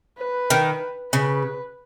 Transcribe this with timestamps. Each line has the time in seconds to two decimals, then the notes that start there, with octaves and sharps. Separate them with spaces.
0.18 B4
0.50 D#3
1.13 C#3 B4